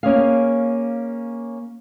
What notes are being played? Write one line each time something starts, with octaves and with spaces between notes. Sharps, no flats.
A#3 C#4 G#4 F5